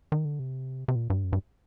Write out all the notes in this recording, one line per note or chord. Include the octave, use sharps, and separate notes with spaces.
D#3
D3
C3
C3
A#2
G2
F#2
G2